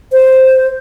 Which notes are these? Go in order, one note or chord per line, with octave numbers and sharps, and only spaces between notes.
C5